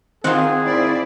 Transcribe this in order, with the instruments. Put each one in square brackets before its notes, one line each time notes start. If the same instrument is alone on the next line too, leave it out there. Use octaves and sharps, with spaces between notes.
[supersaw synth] D#3 C4 [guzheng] F4 F#5 [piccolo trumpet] G#4
[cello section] E4 C5 D5